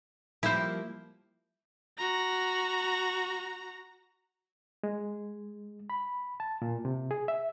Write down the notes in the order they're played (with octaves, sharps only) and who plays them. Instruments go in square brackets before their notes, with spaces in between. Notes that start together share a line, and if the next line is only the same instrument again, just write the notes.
[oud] F3 G3 A#3 [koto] E4 C5
[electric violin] F#4 A#5
[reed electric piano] G#3
B5
A5
A#2
C3
G#4
E5